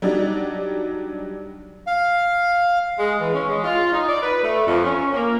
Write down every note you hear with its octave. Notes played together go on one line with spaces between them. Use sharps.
F#3 G3 D4 D#4
F5
G#3
E3
C#4
G#3
F4
D#4
D5
B4
A3
F2
C#4
A#3